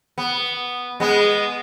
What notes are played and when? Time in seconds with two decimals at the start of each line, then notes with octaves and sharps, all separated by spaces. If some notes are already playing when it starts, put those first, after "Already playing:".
0.18 B3
1.00 G#3 B3